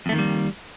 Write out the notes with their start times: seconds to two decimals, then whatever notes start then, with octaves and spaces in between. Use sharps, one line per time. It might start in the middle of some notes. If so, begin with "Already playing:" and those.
0.06 F2
0.09 A3
0.12 D#3
0.15 A#3
0.19 G3